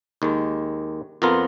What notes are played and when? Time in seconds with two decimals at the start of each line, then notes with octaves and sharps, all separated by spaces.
0.22 D#2 D#3 G#3
1.22 F2 F3 B3 F4 A#4